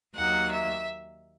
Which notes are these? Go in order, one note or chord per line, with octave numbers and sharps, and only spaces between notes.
D#2 D#3 F#3 A#3 F#5
E5